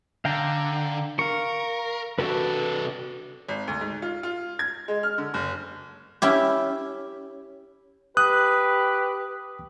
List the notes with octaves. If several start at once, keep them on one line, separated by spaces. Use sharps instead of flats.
D3 F5 G5 A#5
A#4 F5 C#6
C3 D4 F#4 A4 B4
G#1
D2
G#2
F4
F4
G#6
G#3
F6
D3
F#1
C#4 E4 G4
G4 B4 D#6 F#6